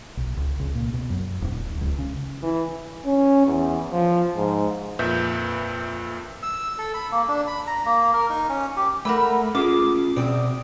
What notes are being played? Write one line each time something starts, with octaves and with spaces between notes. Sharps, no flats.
B1
C#2
C#2
A#2
B2
F#2
D#1
D1
C#2
C#3
E3
C#4
E2
F3
G#2
F2 A#2 B4 E5 G6
E6
A4
B5
A#3
D4
B5
A#5
A#3
A#4
D#4
C#4
G4
A3 A#4 F#5 B5
C#4 F4 G#4 D6
B2 C4 D5 G5 D#6